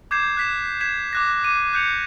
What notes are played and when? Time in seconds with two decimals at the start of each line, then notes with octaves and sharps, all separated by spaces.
0.11 D6 G6 G#6 C7 E7
0.37 F#6 B6 E7
0.81 G#6 B6 E7
1.13 D6 F#6 A#6
1.44 D6 D#7
1.73 F#6 G6 C#7 F7